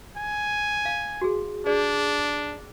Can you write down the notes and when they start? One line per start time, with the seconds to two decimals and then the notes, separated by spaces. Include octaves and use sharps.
0.17 G#5
0.85 F5
1.22 F#4 G#4
1.66 D4 G#4 D5